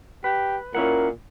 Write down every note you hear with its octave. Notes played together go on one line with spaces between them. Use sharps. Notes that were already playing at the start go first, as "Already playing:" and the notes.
G4 B4
A#2 C#4 E4 A#4 F#5